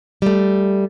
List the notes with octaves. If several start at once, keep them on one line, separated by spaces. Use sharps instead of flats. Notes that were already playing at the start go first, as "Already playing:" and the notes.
G3 A3